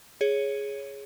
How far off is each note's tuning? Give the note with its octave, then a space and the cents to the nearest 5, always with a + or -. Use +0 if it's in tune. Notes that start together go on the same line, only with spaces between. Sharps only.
G#4 +0 C#5 +0